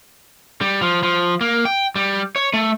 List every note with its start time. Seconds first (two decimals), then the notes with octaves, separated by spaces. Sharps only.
0.61 G3
0.81 F3
1.03 F3
1.41 A#3
1.65 G5
1.96 G3
2.36 C#5
2.53 A3